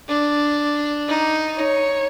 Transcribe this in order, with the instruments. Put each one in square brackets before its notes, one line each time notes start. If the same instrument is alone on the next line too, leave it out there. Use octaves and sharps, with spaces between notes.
[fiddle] D4
D#4
[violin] C#5